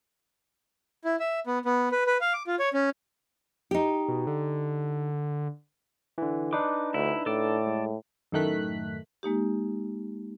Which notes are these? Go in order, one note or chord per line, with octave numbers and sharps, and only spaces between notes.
E4
E5
B3
B3
B4
B4
F5
D6
F4
C#5
C#4
D#4 G4
B2
D3
D3 E3
D4 D#4 B4 D6
D2 E4
A2 A4 D5
G#3
F#2 A2 D#3 A3 F#6 B6
G#3 A#3 D#4 G4